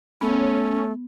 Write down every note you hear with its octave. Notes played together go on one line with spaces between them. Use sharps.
A3 B3 C#4